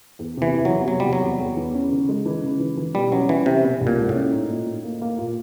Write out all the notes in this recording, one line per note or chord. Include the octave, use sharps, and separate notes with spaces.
E2
C3 E3
E2
F#3
C3
E2 F#3
G3
C3
F#3
E2
E2
E3
C#4
C#3
G#3
E3
C#3
E3
E3
B2 G3
F#3 C#4
E3 C#4
C3 C#4
B2
C2
A#2
G#3
A2
C#4
D#4
A#2
D#4
A#3
A#3
A#2